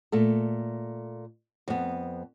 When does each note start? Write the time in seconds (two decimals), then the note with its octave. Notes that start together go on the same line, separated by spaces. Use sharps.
0.12 A#2 A3 A4
1.68 F2 B3